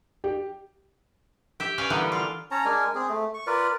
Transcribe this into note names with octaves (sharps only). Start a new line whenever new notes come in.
G4
G4 E5
C#4 B4 D5 F5 G#5
D3 E3 G3 A#3 B3
F4
C#4 C#5 A5 A#5
G#3 D4 A#4 G#5
C4 G#4
A3
C#6
F4 A#4 B4 D5